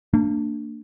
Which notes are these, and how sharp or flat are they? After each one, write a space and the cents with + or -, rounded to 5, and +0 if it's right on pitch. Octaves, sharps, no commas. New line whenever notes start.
A#3 -35 D4 +5